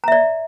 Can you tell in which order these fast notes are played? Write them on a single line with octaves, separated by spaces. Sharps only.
A#5 E5 D5